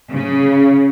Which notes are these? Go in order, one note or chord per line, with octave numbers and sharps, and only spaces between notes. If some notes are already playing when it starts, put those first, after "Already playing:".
C#3